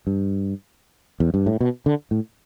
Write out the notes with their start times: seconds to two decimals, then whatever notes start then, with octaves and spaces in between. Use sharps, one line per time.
0.07 G2
1.20 E2
1.34 G2
1.46 A2
1.60 B2
1.86 D3
2.11 A2